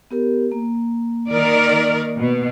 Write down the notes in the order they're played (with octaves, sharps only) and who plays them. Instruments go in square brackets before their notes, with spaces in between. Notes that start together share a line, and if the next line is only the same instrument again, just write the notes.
[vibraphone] B3 G4 A#4
A#3
[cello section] D#3 A#4 D5
B2